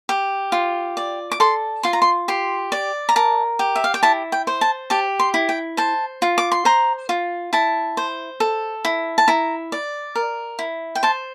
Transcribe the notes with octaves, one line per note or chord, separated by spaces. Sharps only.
G4
F4
D5
D6
A4 C6
F4 C6
A#5
C6
G4 C6
D5
A#5
A#4 A5
G4
E5
F5
G5
E4 A5
G5
C5
A5
G4 A5
C6
E4
G5
C5 A5
F4
D6
C6
C5 A#5
F4
E4 A5
C5
A4
E4
A5
E4 A#5
D5
A#4
E4
G5
C5 A5